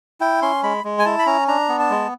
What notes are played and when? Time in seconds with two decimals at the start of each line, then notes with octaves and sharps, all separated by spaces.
0.21 E4 G5
0.42 C#4 C6
0.63 G#3 B5
0.84 G#3
0.99 G#5
1.05 E4 A5
1.19 B5
1.26 C#4 A#5
1.48 D4 A#5
1.69 B3
1.80 A5
1.90 G#3